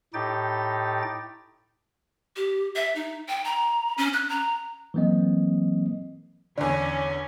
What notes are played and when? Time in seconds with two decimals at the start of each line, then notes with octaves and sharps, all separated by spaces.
0.14 A2 D#4 G4 G5 A6
2.36 G4
2.76 E5
2.95 D#4
3.28 G5
3.45 A#5
3.98 C#4
4.13 F#6
4.29 A#5
4.94 E3 F#3 A#3 C4 D#5
6.58 E2 D3 C#4 D5